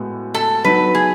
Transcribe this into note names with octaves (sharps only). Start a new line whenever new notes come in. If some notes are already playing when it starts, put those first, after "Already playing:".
Already playing: A2 G#3 B3 F#4
A4
F#3 B3 D#4 B4
G#4